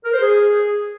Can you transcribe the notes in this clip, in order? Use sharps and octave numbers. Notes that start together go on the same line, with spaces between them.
A#4
C5
G#4